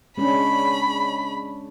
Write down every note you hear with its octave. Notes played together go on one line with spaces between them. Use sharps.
G#3 C#4 D4 B5